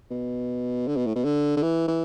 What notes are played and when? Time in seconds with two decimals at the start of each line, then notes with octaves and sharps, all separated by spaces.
0.11 B2
0.87 D3
0.97 B2
1.06 A2
1.16 B2
1.25 D3
1.57 D3
1.63 E3
1.88 E3